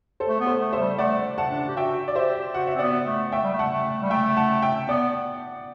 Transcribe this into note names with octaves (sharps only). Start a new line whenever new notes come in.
A4 C5
A3
B3
A4 C5
A3
C5 E5
G3
A3 D5 F#5
F#5 A5
D4
G4
F#4 E5 G5
D5
G4 C5 E5
F#4 F#5
E5
C4
B3 D5 F#5
A3
A3 E5 G5
G3
A3
F#5 A5
A3
G3
A3 E5 G5
F#5 A5
E5 G5
B3 D5 F#5